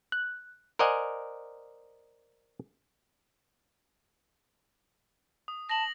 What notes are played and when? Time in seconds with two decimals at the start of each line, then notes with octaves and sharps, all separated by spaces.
0.12 F#6
0.79 A#4 C5 D5 D#5 F#5 G#5
5.48 D#6
5.69 A5 A#6 F#7